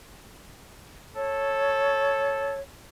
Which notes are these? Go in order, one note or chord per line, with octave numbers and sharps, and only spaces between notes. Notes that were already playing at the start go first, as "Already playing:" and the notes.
A4 C#5